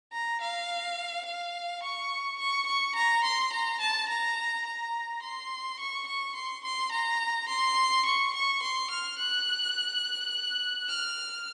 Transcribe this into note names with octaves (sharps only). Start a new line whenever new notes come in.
A#5
F5
F5
C#6
C#6
C#6
A#5
C6
A#5
A5
A#5
A#5
C6
C#6
C#6
C6
C6
A#5
C6
C#6
C#6
C6
F6
F#6
F6